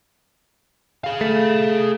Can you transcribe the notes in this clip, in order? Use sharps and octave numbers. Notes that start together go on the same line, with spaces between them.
G#4 F5
A3